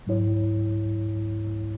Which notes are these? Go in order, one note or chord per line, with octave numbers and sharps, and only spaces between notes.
G#2 F#3 E4 C#5